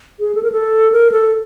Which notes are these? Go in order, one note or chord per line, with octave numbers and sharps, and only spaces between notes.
G#4
A4
A#4
A4
A#4
A4